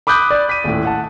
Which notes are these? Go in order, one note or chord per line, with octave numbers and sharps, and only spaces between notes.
B5 D6 D#6 F#6 G6
D5
B6 D#7
D#1 A2
F#5 A5